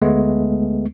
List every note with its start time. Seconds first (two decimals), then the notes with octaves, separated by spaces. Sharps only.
0.02 D2 G#3 A3 B3